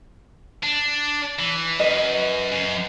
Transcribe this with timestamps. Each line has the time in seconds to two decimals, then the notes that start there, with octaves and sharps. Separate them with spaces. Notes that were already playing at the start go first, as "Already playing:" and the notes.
0.63 D4
1.39 E3
1.80 F#2 B4 D#5
2.52 F#2